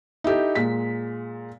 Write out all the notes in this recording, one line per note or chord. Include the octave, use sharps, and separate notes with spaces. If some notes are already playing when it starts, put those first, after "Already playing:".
D#4 E4 G4 A4
A#2 G#3 B6